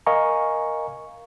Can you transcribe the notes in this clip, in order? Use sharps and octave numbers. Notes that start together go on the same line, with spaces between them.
A#4 D#5 F5 G#5 A#5 C#6